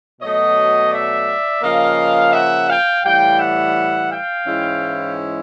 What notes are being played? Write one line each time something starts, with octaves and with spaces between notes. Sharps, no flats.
B2 F#3 A3 C#5 D#5
D5 E5
C#3 F3 A#3 D#5 F5
E5 F#5
F5 G5
A2 E3 G3 F5 G5
E5 F#5
F5 G5
G#2 E3 G#3 C#4 E4